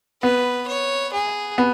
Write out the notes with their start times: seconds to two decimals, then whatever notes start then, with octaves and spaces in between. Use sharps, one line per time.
0.22 B3 B4
0.68 C#5
1.13 G#4
1.58 B3